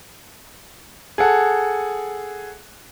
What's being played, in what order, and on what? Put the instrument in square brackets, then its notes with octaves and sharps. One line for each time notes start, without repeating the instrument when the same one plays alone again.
[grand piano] G#4 A4 F#5